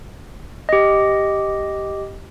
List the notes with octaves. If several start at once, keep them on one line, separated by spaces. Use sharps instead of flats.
G4 D#5